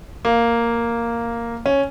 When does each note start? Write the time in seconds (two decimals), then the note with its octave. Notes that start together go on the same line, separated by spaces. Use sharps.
0.25 A#3
1.66 C#4